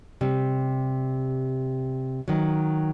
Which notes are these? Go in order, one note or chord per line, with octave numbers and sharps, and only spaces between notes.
C3 G3
D#3 F#3